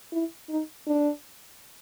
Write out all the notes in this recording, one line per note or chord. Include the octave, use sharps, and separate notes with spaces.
E4
D#4
D4